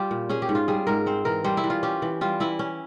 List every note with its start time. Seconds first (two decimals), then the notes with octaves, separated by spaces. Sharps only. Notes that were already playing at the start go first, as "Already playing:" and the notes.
Already playing: G3 F4 G4
0.11 A#2
0.29 C#4 G#4
0.42 G4
0.49 G#2
0.55 F4
0.68 G3 G#4
0.87 G#2 A#4
1.06 C4 C5
1.25 E3 A#4
1.44 G3 C5
1.57 E4
1.64 E3
1.70 F4
1.83 C#4 G4
2.02 E3
2.21 G3 F4
2.40 E3 E4
2.59 C#4